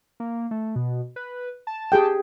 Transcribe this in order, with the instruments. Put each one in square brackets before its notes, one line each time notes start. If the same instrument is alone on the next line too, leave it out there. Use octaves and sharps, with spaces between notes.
[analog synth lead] A#3
A3
B2
B4
A5
[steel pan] G4 G#4 G5